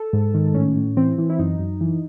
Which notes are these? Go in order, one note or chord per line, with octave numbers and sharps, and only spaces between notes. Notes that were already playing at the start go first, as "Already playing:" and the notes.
Already playing: A4
G#2
D#3
A2 C#4
A2
E3 C4
E3
E4
F#2 D#4
F#2
E3